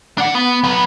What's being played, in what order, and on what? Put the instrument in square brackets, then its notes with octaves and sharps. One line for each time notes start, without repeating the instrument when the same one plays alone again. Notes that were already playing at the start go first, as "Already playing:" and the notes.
[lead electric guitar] D4 F#5
B3
F#3 B4